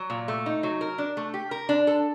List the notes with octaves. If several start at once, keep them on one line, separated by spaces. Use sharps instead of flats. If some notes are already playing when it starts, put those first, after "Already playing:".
Already playing: F#3
A#2
A3
D#4
F#3
A#4
D4
A3
G4
A#4
D4
A4